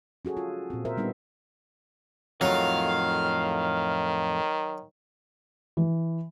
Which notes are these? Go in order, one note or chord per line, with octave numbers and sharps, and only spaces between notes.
C#4 F#4 G#4 A4
F4
A#2 C4
A#4 C5 E5
G3 B3 D4 D#4
F2 A2 D#3 F#3 F4 F5
E3